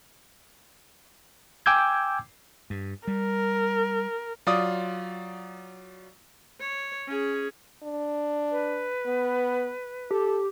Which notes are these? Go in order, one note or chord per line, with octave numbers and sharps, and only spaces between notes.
G5 G#5 D6 E6 G6 G#6
G2
G3 A#4
F#3 F4 D5 D#6
C#5
C#4 G#4
D4
B4
B3
G4 A4